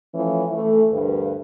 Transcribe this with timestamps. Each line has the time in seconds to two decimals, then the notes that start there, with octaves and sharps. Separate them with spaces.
0.13 E3 F3 A3 C#4 E4
0.52 E3 A3
0.91 D2 G2 A#4 B4